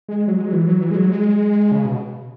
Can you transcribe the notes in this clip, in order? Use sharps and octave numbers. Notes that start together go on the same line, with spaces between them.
G#3
F#3
G#3
F#3
E3
F#3
E3
G#3
F#3
G#3
C#3
B2